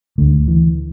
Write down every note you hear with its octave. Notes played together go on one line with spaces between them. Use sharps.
D2 D3 A3
E3